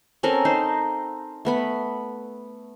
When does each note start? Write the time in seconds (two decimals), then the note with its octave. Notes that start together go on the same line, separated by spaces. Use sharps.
0.23 C4 C#4 A4 A#4
0.45 D#4 C5
1.45 A3 B3 B5